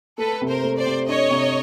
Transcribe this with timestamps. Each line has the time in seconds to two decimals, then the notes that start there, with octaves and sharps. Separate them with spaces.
0.18 A3 A4 B4
0.41 C3
0.48 A#4 C5
0.63 A3
0.78 C5 D5
0.86 C3
1.08 D4 C#5 D#5
1.31 C3